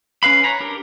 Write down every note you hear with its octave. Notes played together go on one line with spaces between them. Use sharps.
C#4 B4 F5 B5
C#5 A#5 B5
D4 G4 A#4